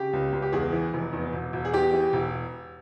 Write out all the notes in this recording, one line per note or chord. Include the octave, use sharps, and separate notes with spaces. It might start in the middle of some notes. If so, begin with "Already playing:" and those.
Already playing: C#3 G4
C#2
C#2
G4
E2 G#4
E3
F1
E2
E1
E1
G#4
E2 G4
E3
E1